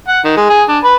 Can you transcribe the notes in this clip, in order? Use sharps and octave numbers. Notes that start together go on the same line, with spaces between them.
F#5
D#3
G#3
G#4
D4
B4